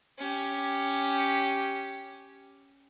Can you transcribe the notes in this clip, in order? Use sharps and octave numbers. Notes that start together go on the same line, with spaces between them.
C#4 G4